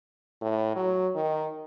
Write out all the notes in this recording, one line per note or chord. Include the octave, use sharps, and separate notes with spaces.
A2
F#3
D#3